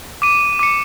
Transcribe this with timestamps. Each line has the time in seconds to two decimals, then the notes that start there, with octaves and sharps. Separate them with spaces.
0.22 D6 D#7
0.59 D6 C#7